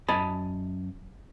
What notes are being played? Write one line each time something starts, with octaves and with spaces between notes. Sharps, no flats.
F#2 D#5 G#5 A5 B5